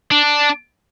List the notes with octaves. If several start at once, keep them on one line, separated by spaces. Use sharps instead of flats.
D4